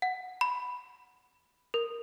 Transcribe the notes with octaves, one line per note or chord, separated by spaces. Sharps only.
F#5
B5
A#4